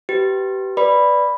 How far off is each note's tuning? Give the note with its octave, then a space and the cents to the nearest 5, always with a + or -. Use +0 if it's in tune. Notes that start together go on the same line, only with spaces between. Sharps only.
G4 -25 B4 +15
B4 +0 D5 +0 B5 +0